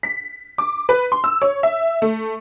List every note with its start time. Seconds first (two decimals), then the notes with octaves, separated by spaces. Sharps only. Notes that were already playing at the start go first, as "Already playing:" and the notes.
0.03 B6
0.58 D6
0.89 B4
1.12 C6
1.24 E6
1.42 C#5
1.63 E5
2.02 A3